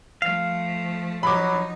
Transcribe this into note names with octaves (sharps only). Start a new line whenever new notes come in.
F3 A3 F5
F3 F#3 D#4 B5 D6